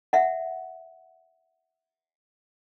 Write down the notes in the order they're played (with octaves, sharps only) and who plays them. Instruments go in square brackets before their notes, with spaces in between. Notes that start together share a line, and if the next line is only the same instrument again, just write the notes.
[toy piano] E5 F#5